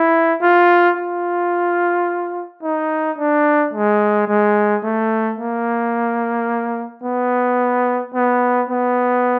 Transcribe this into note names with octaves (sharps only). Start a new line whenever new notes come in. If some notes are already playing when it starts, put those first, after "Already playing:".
Already playing: E4
F4
F4
D#4
D4
G#3
G#3
A3
A#3
B3
B3
B3